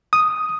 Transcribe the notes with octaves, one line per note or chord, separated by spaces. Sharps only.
D#6